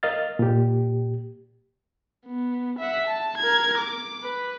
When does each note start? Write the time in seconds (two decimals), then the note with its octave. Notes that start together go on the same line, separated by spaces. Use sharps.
0.03 A#4 D#5 F5 F6 A6
0.39 A#2 G4
2.27 B3
2.79 E5 F#5
3.08 A5
3.38 A#4 G#6
3.78 D6
4.23 B4